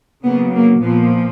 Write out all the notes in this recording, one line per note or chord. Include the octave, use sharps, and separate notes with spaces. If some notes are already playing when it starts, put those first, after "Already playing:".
C#3 F#3 A#3 B3
A#3
A#2 F3 A#3 B3